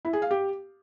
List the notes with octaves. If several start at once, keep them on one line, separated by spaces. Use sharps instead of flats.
E4
G#4
F5
G4